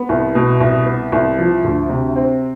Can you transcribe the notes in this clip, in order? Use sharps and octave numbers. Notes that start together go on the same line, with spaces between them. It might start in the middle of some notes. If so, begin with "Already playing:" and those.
Already playing: B3
C2
B2
C2
B3
C2
F3
D2
C3
C4